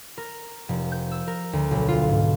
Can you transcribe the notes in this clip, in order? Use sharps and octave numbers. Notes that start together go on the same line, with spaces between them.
A#4
F1
G6
E6
A#4
D2
B1
F4
G#2